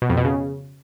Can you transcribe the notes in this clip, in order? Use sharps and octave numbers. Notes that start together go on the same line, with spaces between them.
B2
F2
B2
C#3